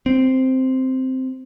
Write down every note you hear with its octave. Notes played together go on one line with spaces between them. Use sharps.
C4